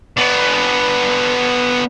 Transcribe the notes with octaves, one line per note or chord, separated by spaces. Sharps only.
B3 D4